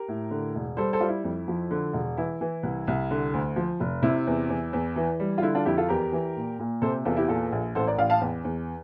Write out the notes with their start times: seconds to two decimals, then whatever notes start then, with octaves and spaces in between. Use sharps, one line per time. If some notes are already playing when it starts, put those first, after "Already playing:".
Already playing: G4 A#4
0.08 A2
0.31 D3
0.55 E1
0.77 G3 A4 C5
0.93 A4 C5
1.00 G3 F4
1.08 E4
1.24 F2
1.48 F3
1.71 D3
1.93 E1
2.17 E3 E4
2.41 E3
2.63 C2
2.87 C2
3.11 D3
3.34 D2
3.56 F3
3.80 F1
4.03 C3 E4
4.27 E2
4.50 E2
4.73 E2
4.96 E3
5.20 G3
5.38 F4
5.42 D3 E4
5.55 D4 F4
5.65 F2 E4 G4
5.77 F4 A4
5.89 E2 G4 A#4
6.13 E3
6.36 A#2
6.59 A#2
6.82 C3 A4 C5
7.05 E2 F4 A4
7.17 E4 G4
7.28 A#2 F4 A4
7.52 A#1
7.75 A1 A4 C5
7.87 A#4 D5
7.98 A1 D5 F5
8.10 F5 A5
8.21 E2
8.44 E2